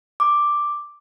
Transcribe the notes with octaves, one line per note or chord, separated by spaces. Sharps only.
D6